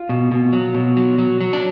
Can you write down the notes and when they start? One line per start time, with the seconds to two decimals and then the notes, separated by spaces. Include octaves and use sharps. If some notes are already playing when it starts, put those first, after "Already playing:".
Already playing: F4
0.09 B2
0.31 B2
0.53 F#3
0.74 B2
0.97 F#3
1.18 F#3
1.41 F#3
1.53 D4